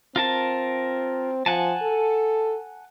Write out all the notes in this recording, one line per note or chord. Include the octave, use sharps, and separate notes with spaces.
C4 F4 A#4 A5
F3 F#5 G#5 A5
A4